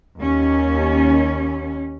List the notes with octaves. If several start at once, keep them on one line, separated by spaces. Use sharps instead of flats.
D#2 C#4